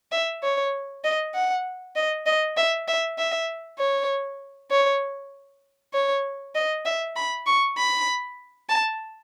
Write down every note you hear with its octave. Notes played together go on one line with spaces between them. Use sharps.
E5
C#5
D#5
F#5
D#5
D#5
E5
E5
E5
C#5
C#5
C#5
D#5
E5
B5
C#6
B5
A5